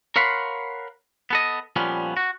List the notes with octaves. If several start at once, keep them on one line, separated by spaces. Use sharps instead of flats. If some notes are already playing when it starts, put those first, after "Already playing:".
A#4 C#5 F5 F#5 B5 C6
B3 A4 D#5
A#2 F3 G3 B3 C#4
F#4